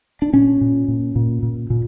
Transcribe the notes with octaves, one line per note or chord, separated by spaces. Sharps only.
D4
A#2 C#4
A#2
A#2
A#2
A#2
A#2